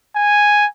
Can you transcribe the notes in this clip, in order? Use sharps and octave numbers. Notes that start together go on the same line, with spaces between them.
G#5